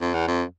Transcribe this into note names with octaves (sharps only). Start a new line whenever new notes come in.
F2
E2
F2